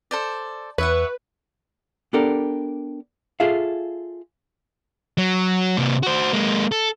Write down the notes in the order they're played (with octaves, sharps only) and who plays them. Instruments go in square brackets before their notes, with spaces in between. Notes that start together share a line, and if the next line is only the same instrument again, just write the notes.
[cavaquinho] A4 C5 D5
[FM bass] E2 [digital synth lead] B4 [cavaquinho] C#5 E5 F#5
[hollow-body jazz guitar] B3 D4 G4 A4 A#4
F4 G#4 A4 E5 F5
[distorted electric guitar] F#3
C3 A#3
F#4 C5
G#3 A#3
A4